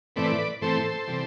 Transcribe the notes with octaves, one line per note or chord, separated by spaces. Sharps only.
A2 E3 A3 C4 B4 D5
A2 E3 A3 C4 A4 C5
C3 E3 G3